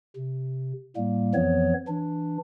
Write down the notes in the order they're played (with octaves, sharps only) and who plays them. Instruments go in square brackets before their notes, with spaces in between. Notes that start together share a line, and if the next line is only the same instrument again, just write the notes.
[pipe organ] C3
A2 G3 A#3
F2 E3 F3 B3 C#5
E3 D4